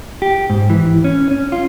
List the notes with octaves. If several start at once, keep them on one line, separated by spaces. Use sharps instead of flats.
G4
G#2
E3
C#4
C#4
F4